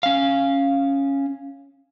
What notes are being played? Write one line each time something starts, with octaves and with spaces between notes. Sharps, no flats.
C#4 F5